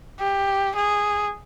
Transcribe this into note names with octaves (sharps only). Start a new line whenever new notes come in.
G4
G#4